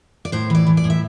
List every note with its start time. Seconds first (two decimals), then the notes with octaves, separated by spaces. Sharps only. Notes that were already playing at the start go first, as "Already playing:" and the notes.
0.25 D5
0.32 A2 C5
0.50 E3 D5
0.67 E3
0.77 D5
0.84 A2
0.90 E5